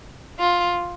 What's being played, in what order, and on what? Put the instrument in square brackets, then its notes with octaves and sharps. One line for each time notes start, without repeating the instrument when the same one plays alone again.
[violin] F4